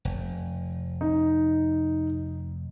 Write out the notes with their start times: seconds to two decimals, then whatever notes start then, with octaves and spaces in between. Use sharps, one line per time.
0.05 F1
1.01 D#4